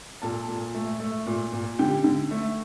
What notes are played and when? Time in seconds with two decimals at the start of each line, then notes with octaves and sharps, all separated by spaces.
0.22 A#2 A4 A5
0.48 A#2
0.75 A3
1.00 A3
1.26 A#2
1.53 A#2
1.79 D3 G4 G5
2.04 D3
2.31 A3